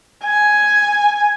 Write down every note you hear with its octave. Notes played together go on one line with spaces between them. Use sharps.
G#5